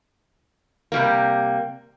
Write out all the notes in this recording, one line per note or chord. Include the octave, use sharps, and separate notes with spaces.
C3 G3 A#3